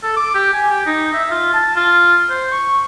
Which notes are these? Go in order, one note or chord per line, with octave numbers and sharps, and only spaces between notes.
A4
D6
G4
G#5
G4
D#4
E5
F4
A5
F4
C5
C#6